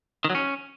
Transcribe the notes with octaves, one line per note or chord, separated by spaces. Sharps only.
D#3
F#3
C#4